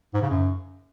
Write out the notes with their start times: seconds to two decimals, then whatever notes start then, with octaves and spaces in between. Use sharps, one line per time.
0.14 G#2
0.22 C#3
0.30 F#2